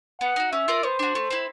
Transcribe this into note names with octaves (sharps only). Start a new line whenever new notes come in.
B3 F#5
D#4 F#4
C#4 E5
F4 A#4 D5
B3 C5
D4 F#4
A3
C4 E4